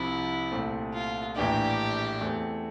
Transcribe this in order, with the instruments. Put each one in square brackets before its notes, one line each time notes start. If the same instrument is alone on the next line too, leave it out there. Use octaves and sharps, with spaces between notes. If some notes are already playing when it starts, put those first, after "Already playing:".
Already playing: [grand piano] C2 C3 F3 [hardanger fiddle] E4
[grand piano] C2 A#2 A3 C4
[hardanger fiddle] F4
[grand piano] A#1 A2 E3 A#3 D4 [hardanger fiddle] G4
[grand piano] E2 E3 A3 C4